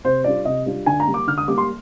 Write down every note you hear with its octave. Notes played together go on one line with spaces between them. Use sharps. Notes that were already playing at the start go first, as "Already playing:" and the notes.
C3 C5
G3 D4 F4 D5
C3 D#5
G3 D4 F4
D3 G#5
A#5
G3 A#3
D6
D3 F6
D#6
G3 A#3 D6
C6